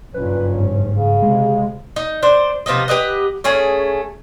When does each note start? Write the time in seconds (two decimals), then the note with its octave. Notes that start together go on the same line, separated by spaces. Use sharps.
0.14 F#1 G2 A#2 C#4 B4
0.58 G#2
0.93 C#3
1.22 C3 G#3
1.96 D#4
2.23 D4 C5
2.66 C3 F3 B3 D#4
2.88 G4 B4 D#5 F#5
3.44 A3 C#4 G#4